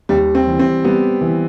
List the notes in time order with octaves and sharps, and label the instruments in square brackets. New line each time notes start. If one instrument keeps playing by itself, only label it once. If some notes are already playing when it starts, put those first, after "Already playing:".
[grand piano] D#2 [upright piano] G3
[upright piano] C4
[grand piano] E3
[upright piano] C4
[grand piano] G3 [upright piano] B3
[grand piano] E3